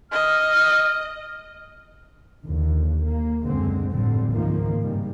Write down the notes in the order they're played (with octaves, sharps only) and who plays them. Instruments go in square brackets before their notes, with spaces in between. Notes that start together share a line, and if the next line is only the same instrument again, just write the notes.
[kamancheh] D#5 [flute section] F6
[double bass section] D#2 D3 F3
A#3
C#2 F#2 D3 G#3 C4
G1 F2 A2 D3 G3 C4
C#2 G#2 D#3 F3 A#3 C4
G2 C3 D#3 G3 G#3